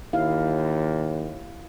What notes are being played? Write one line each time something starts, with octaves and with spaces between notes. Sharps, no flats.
D#2 E4 F5